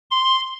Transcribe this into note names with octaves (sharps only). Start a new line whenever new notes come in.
C6